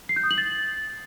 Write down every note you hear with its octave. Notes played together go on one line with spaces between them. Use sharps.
C7
G6
D#6
F#7
A6